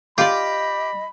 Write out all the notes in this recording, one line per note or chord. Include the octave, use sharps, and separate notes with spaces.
F4 G4 D5 D#5 B5